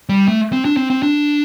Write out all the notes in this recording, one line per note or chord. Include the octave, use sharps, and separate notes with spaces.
G3
A3
C4
D4
C4
C4
D4